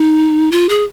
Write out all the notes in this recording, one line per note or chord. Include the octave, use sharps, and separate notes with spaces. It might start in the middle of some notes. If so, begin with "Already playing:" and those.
Already playing: D#4
F4
G#4